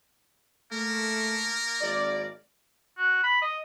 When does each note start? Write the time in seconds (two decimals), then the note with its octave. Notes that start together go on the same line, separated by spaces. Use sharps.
0.72 A3 A#3 A#4
1.81 G#1 D5
2.98 F#4
3.24 B5
3.42 D#5